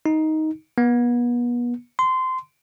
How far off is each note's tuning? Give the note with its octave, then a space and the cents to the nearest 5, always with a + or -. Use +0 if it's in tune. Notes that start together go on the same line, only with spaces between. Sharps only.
D#4 +10
B3 -35
C6 -20